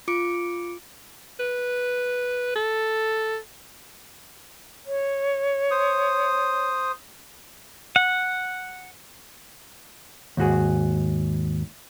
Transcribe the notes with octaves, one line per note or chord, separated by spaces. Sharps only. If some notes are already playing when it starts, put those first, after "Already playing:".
F4 D6 C#7 D7
B4
A4
C#5
C5 D#6
F#5
D#2 G#2 F#4 G#4